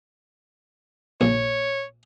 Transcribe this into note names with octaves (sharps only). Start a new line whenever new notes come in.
A#1 C#5